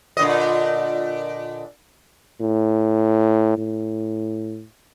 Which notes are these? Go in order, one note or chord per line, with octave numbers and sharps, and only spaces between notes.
A#2 D3 D#5
A2
A2